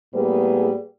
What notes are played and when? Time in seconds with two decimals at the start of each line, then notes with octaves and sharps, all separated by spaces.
0.14 A2 G3 A#3 B3 G#4 B4